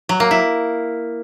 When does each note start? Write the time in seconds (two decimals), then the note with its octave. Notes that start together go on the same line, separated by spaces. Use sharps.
0.09 F#3
0.20 A#3
0.31 E4